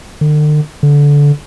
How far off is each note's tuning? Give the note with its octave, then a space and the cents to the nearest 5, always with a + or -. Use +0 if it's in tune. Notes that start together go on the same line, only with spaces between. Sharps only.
D3 +45
D3 -20